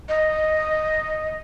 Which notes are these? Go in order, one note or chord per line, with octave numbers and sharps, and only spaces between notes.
D#5